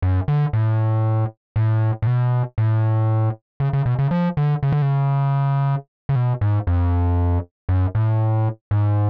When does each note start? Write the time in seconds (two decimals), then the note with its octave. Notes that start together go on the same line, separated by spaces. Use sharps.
0.02 F#2
0.28 D3
0.53 A2
1.56 A2
2.02 A2
2.07 B2
2.58 A2
3.60 C#3
3.73 C#3
3.86 B2
3.99 C#3
4.11 F3
4.37 D3
4.63 C#3
4.72 D3
4.82 C#3
6.09 C#3
6.16 B2
6.41 G#2
6.67 F2
7.69 F#2
7.95 A2
8.71 G#2